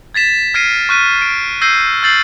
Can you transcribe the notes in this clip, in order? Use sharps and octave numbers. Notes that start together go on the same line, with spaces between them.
G#6 A6 B6 E7
F6 G#6 A#6 C7 D7 D#7
C#6 F6 F#6 B6 D#7
D7
E6 G6 G#6 A#6 C7 D#7
E6 G6 A6 C7 F#7